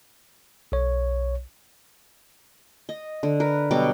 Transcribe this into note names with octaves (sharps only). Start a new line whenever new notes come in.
B1 C#5
D#5
D3
A#4 B4
B2 F#3 G3 D6